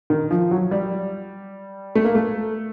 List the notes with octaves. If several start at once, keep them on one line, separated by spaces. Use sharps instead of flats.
D#3
F3
F#3
G3
A3
A#3
A3